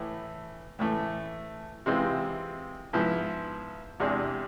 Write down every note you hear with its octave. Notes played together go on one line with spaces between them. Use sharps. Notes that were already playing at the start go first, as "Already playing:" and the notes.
Already playing: A2 E3 A3
A2 E3 A3
C3 E3 G#3 C4 F4
G#2 F3 B3 E4 G#4
E2 C3 G#3 D4 G#4